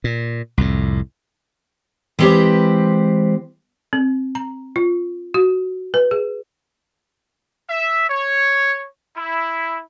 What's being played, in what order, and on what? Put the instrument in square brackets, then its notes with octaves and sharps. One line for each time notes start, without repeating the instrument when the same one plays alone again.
[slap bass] A#2
C2 F2 A2
[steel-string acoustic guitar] E3 G#3 C4 G4 B4 C5
[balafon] C4
A#5
F4
F#4
B4
G#4
[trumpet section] E5
C#5
E4